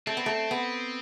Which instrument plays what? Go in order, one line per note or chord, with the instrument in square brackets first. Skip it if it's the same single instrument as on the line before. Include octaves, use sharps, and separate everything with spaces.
[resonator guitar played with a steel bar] A3 [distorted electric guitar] C4
[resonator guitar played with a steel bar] B3
A3
B3